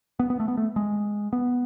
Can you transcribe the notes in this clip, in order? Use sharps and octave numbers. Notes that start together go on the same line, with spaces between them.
B3
B3
A3
B3
A3
G#3
B3